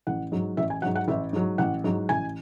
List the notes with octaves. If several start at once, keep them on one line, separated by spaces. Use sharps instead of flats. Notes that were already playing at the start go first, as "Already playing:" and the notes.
A1 F#5
G#2 F#3
A1 E5
G#5
G#2 F#3 F#5
F#5
A1 E5
G#2 F#3
A1 F#5
G#2 F#3
A1 G#5